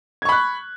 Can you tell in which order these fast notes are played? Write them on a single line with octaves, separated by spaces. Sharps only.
G#6 C#6 B5 F#6